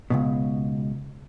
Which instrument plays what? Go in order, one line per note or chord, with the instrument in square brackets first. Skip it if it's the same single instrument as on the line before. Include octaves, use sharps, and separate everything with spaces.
[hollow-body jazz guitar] C#2 G2 B2